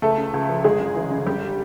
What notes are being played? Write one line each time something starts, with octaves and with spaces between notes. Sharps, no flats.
C#2 A3 A4
C#3
C#2
F3
G1 G#3 G#4
F#2
E3
C#3
G1 G3 G4